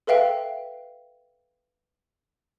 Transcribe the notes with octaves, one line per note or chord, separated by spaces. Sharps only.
A4 B4 E5 F5 G5